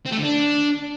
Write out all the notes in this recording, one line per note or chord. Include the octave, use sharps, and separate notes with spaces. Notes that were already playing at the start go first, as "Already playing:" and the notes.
C4
A3
D3
D4